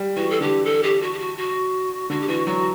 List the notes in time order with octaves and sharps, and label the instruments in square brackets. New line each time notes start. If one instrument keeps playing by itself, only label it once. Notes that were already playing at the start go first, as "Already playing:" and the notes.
Already playing: [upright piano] G3
[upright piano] E3 [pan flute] F#4
[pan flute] A4
[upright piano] D3 [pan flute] G4
[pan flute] A4
G4
F#4
G4
F#4
F#4
[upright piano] D3 [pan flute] F#4
[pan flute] G4
[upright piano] E3 [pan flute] F#4
[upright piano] F#3 [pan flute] F#4